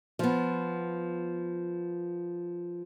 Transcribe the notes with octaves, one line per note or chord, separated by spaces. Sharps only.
F3 B3